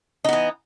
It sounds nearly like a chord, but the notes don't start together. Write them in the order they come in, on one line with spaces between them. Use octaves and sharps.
D#4 B3 E3